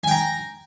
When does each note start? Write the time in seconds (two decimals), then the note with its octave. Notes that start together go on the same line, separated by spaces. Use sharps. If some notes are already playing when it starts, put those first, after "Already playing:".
0.04 G#5
0.07 G5
0.11 A#5